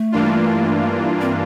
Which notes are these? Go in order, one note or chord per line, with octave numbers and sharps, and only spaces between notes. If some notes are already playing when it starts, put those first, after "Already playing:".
Already playing: A3
G2 E3 A#3 D4 F4
C4